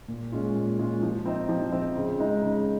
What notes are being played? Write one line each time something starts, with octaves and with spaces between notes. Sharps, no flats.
A#2
G#3 C#4 F4
A#2
G#3 C#4 F4
F3
C4 D#4
F3
C4 D#4
C#3
G#3 D#4
C#3